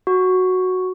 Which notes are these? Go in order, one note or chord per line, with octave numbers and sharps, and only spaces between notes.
F#4